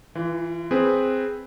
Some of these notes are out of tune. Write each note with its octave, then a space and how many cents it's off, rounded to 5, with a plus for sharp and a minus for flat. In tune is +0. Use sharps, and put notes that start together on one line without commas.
E3 +0 F4 -35
C4 +0 G#4 +0 B4 +0